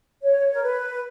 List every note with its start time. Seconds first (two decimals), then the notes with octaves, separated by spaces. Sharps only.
0.22 C#5
0.52 A#4
0.63 B4